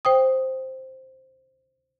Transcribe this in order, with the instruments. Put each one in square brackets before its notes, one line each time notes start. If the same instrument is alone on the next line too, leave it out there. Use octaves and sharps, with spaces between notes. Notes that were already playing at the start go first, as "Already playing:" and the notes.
[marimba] C5 G5 D#6